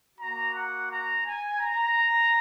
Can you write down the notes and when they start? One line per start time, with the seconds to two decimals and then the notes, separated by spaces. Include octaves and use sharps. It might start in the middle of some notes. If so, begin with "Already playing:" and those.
0.19 A#3 F#4 A#5
0.54 F#5
0.90 A#5
1.25 G#5
1.60 A#5